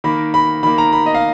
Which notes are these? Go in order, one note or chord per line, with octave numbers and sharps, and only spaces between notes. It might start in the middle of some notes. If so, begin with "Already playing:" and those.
D#3 A#3 B5
B5
D#3 A#3 B5
A#5
B5
D#5
F5